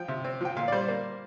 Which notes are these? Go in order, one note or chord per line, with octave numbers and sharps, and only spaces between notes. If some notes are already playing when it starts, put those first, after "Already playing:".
Already playing: F3 G5
C3
C4
F3 G5
A#2 F5
D5
G3 C5
A#3